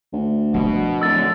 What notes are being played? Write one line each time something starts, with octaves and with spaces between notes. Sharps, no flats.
D2
B2 F3 D4
D1 F#2 D3 E6 A6